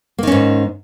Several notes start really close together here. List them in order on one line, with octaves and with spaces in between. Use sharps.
A#3 D#3 C#4 G#2